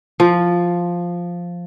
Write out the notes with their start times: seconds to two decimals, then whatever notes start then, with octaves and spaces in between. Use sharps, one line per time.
0.20 F3